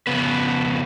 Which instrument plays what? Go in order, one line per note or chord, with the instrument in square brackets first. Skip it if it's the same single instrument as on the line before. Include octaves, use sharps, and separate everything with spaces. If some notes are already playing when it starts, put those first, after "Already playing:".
[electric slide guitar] F2 C#3 B3 B4